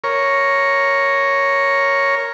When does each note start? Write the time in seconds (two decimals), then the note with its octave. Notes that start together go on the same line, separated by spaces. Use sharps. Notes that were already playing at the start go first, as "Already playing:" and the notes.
0.04 A#4 C#5